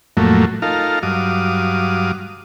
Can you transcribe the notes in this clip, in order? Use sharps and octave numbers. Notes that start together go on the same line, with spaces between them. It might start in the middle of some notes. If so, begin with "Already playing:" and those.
F2 A2 F#3 A3 A#3
D#4 F4 A4 A#4 F5
G2 F#3 F5 D6 D#6